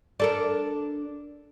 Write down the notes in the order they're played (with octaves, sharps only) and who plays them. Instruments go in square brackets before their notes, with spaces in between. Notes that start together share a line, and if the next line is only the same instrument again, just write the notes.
[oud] D4 A4 A#4